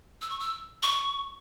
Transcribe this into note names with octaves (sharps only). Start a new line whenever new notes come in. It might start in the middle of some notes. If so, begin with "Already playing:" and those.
E6
C#6
E6
C#6